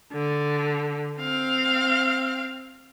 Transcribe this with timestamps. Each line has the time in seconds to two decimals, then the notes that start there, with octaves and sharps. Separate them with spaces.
0.13 D3
1.19 C4 F5